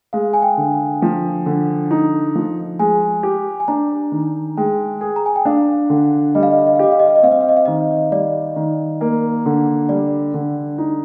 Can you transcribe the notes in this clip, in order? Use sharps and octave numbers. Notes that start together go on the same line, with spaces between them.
G#3 F5
G#5
G5
D3
F3
D3
D#4
F3
G#3 G#5
G4
G#5
D4 A#5
D#3
G#3 G5
G#4
A#5
G#5
G5
D4 F5
D3
G3 D#5
F5
D#5
F5
D#5
F5
G4 D#5
F5
D#5
F5
D#5
C4 F5
D#5
F5
D#5
F5
D#3 D#5
G3 D5
D#3
A#3
D3
G3 D5
D3
D#4